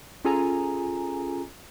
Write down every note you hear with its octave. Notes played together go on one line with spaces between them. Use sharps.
C#4 F4 G#4 A4 G#5 A#5